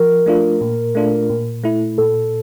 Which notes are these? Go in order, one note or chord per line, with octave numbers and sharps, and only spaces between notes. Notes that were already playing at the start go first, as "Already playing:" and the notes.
Already playing: F3 A#4
A3 D4 F4
A#2
A3 D4 F4
A#2
A3 E4
A#2 A4